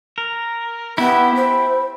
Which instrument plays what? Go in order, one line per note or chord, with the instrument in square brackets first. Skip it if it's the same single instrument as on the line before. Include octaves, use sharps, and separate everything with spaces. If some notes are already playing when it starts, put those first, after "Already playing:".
[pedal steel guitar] A#4
[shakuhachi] B3 [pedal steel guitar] E4 G4 [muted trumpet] B5
[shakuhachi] C5